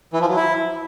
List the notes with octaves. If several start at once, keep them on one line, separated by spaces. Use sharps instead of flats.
E3
F3
F#3
E4